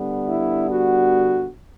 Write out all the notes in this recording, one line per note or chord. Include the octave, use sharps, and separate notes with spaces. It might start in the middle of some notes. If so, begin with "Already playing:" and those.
Already playing: D3 G3 B3
E4
F#4